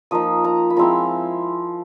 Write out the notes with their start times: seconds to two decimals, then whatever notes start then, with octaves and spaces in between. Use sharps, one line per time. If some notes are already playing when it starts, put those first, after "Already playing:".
0.11 F3 A#3 D#4 D#6
0.44 A#5
0.70 B5
0.76 F3 G#3 C4 E4 A#5